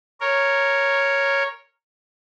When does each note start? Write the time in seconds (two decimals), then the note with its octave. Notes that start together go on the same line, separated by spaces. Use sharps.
0.21 A#4 C#5